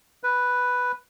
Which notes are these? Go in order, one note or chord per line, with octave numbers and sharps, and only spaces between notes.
B4